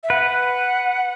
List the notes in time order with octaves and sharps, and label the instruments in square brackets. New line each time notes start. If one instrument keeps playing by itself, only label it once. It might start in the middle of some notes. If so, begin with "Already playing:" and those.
[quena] E5
[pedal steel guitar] B4 [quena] F#5